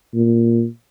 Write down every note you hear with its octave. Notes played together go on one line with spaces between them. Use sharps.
A#2